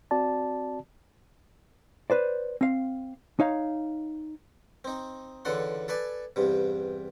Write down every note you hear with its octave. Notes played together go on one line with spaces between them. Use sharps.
C4 F#4 D5 A5
B4 C5 D5
C4 F5
D#4 C#5 F5
C4 D#4
C#2 D3 E3 A4 F#5 C6
A4 B4 D5 G#5
E2 G2 C3